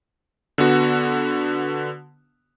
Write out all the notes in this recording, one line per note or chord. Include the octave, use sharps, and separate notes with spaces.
D3 B3 F#4